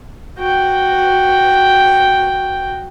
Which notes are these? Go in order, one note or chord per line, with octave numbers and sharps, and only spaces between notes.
F#4 G5